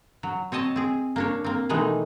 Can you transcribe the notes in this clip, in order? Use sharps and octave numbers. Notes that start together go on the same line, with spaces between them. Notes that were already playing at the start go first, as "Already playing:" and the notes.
F#3
C4 C#5 D#5 A5
C4 G#4
A#3 D4 C#5
A#3 C4
B2 D#3 E3 G#3 A3 D#4